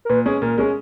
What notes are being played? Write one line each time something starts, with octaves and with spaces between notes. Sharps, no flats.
A#4
A#2 B4
G#3 C#4 G#4
A#2 A#4
G#3 C#4 G#4